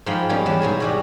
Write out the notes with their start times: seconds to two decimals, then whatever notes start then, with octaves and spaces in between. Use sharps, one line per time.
0.06 G#2 F3 D#5 F5 G5 B5
0.29 G3 A#3 B3 C#4 D#4 C#5
0.46 E2 B4 A5
0.60 G#2 B2 G#4 G#5
0.80 C3 G3 F#4